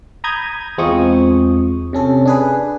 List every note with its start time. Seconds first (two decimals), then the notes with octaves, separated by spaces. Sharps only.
0.24 A#5 B5 D#6 G6 G#6
0.78 E2 G#3 C4 F4 C#6 D#6
1.93 C3 C#4 A4
2.25 D4 G#4 B4